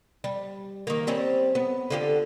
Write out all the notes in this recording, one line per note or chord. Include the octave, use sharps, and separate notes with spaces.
G3
D#3 A#3
G3 C4 C#4
B3
D3 F4 G4